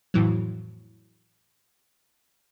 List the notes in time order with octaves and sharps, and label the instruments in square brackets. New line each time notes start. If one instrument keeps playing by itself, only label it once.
[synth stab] F2 A2 E3 F#3